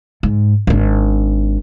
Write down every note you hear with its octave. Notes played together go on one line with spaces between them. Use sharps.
G#2
G#1 D4